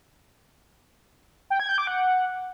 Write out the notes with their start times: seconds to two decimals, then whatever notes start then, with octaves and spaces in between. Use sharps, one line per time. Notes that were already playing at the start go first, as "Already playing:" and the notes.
1.50 G5
1.60 G#6
1.69 G6
1.78 D6
1.87 F#5